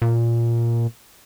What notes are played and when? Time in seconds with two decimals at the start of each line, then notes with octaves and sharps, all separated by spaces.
0.02 A#2